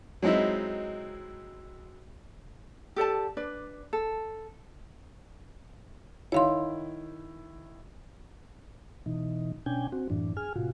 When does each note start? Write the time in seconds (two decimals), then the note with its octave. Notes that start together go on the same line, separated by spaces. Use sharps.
0.23 F#3 G#3 C4 D#4 E4
2.96 G4 A4 D5 A5
3.37 D4 B4 D5
3.93 A4
6.32 D#3 E4 C#5 F5 C6
9.06 B2 E3 D#4
9.66 B2 C#4 D4 G5 G#5
9.92 C4 F#4
10.10 F#2 A2 E3 D4
10.37 G#4 G#5 F6
10.56 A2 C3 F4 F#4